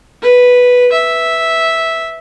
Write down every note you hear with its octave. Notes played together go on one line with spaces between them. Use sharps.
B4
E5